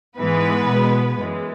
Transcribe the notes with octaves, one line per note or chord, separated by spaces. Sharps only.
G#2 E3 G#3 B3 B4
B2 G#3
F#2 E3 G#3